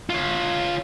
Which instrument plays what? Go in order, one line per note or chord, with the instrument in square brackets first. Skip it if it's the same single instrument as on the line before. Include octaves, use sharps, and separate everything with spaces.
[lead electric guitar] F4 C#5